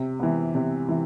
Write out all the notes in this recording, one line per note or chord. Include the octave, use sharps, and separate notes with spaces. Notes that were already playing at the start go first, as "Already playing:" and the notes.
Already playing: C3
E3 B3
C3
E3